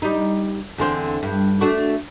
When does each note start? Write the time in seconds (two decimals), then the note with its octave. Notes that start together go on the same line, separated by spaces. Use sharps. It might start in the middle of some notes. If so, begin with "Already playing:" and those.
0.02 G3 D#4
0.78 E2 D3 C4
1.23 G2
1.61 A3 D4 F#4